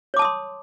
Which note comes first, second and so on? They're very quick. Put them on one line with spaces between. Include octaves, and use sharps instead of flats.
C#5 D6 A5 D#6 C6